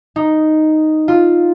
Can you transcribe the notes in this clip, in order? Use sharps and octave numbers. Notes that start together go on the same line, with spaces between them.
D#4
F4